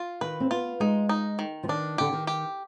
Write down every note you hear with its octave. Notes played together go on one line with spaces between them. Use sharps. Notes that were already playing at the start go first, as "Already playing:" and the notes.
Already playing: F4
D#3 B4
C4
B3 F4
G#3 D#4
D#4
D#3
F3
D#3 D4
D3 G4
D#3
G4